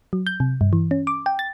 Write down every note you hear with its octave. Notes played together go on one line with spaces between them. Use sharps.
F#3
G6
C3
G2
E3
C#4
D6
G5
A6